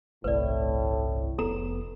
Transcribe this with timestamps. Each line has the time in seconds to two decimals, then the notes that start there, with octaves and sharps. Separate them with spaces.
0.24 G1 C2 A2 B4 D5
1.38 F1 B3 A4 A#5